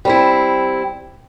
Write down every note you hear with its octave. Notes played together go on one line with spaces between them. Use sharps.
G3 C4 E4